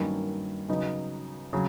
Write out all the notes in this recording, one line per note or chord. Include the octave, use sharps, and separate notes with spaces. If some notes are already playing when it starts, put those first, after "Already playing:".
Already playing: G2 D#3 F#3 A#3 C#4
C#3 F#3 B3 D#4
C#3 F#3